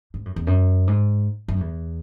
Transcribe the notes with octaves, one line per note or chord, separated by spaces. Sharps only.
G#2
F#2
E2
F#2
G#2
F#2
E2